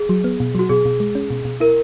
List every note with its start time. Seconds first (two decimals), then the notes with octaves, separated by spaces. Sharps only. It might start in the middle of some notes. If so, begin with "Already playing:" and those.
Already playing: G#4
0.09 F#3
0.24 B3
0.40 B2
0.55 F#3 F#4
0.69 B2 G#4
0.85 B2
1.00 G#3
1.15 C#4
1.30 B2
1.45 B2
1.60 E4 A#4